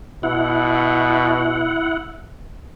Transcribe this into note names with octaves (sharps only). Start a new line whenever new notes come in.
B2 E4 F#5